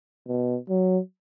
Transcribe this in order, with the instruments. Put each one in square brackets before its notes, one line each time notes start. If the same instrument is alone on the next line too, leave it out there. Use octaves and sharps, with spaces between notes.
[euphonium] B2
F#3